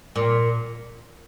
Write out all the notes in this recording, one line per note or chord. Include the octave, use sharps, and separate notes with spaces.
A#2